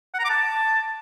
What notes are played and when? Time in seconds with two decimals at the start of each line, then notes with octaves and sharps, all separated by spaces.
0.14 F#5
0.19 A#5
0.24 D6
0.30 A5